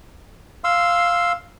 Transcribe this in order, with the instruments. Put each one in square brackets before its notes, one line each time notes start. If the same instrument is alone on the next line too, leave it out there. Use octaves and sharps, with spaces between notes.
[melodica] F5 C6 E6